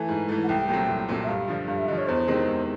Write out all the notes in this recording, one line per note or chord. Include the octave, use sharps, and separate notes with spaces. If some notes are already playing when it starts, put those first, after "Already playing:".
Already playing: E3 A3 G#5
G#2
E3 A3
F#5
C2 G5
A#2 F#3 A3 C4
C2
A#2 F#3 A3 C4
E5
G2 F5
D3 F3
G2 F5
E5
D3 F3 D#5
C#5
E2 C5
C3 D#3 G#3 C4
E2